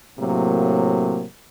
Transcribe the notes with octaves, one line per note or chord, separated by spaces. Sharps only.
A2 C3 F#3 A#3